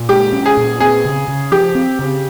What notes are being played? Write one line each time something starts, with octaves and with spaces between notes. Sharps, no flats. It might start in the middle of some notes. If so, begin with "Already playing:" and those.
Already playing: A#2
G#3 G4
C#4
G#4
A#2
C4 G#4
C#3
C#3
F3 G4
C4
C#3